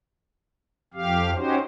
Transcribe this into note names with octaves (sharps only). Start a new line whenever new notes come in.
F2 G4 F5
C#4 D#4 F#4 G4 C5